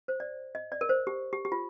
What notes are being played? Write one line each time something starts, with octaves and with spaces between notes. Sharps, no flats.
C5
D5
D#5
D5
A#4
C5
G4
G4
G4
F4